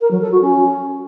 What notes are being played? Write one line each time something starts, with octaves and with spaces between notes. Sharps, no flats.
A#4
F#3
A4
F#4
C#4